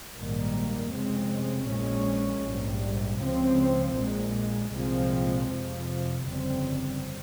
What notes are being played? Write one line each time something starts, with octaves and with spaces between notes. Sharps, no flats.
A#1 G#2 D#3 G3 A#3
F1 F2 C#3 G#3 C4
A#1 A#2 G#3 C#4
A#1 G#2 G3
C#2 C#3 F3 C4
A#1 A#2 G#3
C2 A#2 F3 G#3 C4
F2 C3 F3
G1 F2 C#3 G3 C4